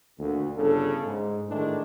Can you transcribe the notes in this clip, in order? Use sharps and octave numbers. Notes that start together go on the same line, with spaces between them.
D2 A#2 D3
G1 C#3 D4 A4
G#2
A2 D#3 E3 G#3 A3 D4